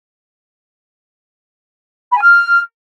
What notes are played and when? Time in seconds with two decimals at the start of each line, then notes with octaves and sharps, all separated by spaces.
2.11 B5
2.16 G#5
2.21 F6